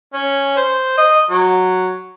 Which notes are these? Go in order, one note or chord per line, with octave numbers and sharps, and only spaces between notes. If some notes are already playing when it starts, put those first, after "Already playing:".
C#4
C5
D#5
F#3